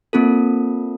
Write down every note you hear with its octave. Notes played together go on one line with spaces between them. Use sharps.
A#3 C4 F4 A4